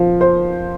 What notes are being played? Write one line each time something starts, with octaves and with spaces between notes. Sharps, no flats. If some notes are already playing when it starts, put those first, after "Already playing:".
Already playing: F3
C5